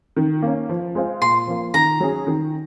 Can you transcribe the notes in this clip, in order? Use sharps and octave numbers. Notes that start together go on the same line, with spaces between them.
D#3
A#3 C#4
F3
G#3 C4 F4
A#2 C6
F3 A#3
D#3 A#5
F#3 C#4 G#4
D#3